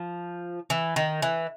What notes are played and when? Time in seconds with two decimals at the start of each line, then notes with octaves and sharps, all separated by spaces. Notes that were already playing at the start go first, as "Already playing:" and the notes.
Already playing: F3
0.70 E3
0.96 D#3
1.22 E3